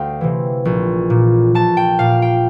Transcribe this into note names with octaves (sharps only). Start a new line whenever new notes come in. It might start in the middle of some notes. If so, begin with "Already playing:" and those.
Already playing: D2 F5 G5
C3 E3
A#1
A#2
A#1 A5
G5
A#2 F5
G5